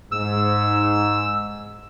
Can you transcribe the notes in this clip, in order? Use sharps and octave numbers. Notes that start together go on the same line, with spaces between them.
G#2 E6